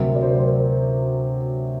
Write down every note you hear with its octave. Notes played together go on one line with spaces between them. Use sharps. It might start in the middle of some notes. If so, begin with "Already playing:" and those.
Already playing: D2 C3 F#3 A#4
D5
C5
A#4
C5
A#4